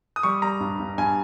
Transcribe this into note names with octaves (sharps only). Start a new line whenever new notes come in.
D#6
G3 C#6
G3 A#5
G2
G2
G2 G#5